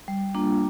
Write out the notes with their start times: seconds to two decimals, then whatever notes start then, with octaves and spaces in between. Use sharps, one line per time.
0.08 G3
0.35 A#3 D4 F4